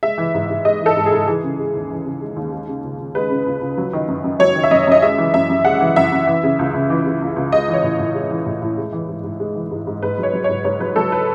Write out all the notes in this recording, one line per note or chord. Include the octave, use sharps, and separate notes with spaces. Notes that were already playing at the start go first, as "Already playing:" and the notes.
G#3 E5
E3
G#2
G#2
G#3 D#5
E3
A4
G#2
G#4
G#2
E3 G#4
C#3
G#3
D#2
E3
C#3
G#3
D#2
G#3
C#3
C#2
C#2
G#3 B4
C#3
C#2
C#2
F#3
D#3
F#2
F#2
F#3 C#5
D#3
E5
F#2 D#5
F#2 D#5
G#3 E5
E3
F#2 E5
F#2
G#3 F#5
E3
F#2 E5
F#2
E3
C#3
C#2
C#2
E3
C#3
C#2
C#2
G#3 D#5
E3
C#5
A2
A2
G#3
E3
A2
A2
G#3
E3
G#2
G#2
G#3
E3
G#2
G#2
G#2 B4
F#3
C#5
F#3
G#2 C#5
G#2 C#5
F#3 B4
F#3 A4
B4